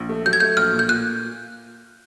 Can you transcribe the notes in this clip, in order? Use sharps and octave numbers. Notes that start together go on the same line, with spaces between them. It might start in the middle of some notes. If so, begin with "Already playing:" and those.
Already playing: A#1
A3
F#3 G6
G#6
A3 G6
A#1 F6
A#2
G6
A#2 F#6